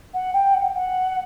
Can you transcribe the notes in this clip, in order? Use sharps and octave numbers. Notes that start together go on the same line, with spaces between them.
F#5
G5
F#5
F#5